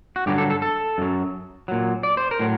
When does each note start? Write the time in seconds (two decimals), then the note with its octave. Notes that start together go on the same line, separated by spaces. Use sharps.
0.16 F#4
0.26 G2 D3 F#3 G4
0.38 A4
0.50 A4
0.62 A4
0.98 F#2 F#3
1.68 A#2 F#3
2.03 D5
2.17 C5
2.31 A#4
2.39 A2 F#3